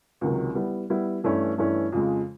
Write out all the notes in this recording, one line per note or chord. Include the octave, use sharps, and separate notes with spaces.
C#2 C3 D#3 F#3
G3 B3 E4
G3 B3 E4
G2 E3 A3 C#4 E4
G2 E3 A3 C#4 E4
F2 C#3 F3 G#3